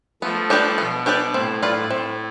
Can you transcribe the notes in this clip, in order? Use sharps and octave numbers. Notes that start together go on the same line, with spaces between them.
F3 A3 B3
D4 G4 B4 D5
B2 B3
D4 G4 B4 D5
A2 C4
F4 B4 D5
A2 C4